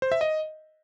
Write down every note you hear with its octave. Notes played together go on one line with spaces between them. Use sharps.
C5
E5
D#5